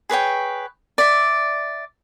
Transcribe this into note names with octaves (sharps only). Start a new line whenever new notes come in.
G#4 B4 C#5 G5
D5 E5